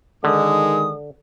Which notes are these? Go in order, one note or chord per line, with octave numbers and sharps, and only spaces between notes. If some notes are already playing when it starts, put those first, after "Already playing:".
D3 D#3 G#3 D#6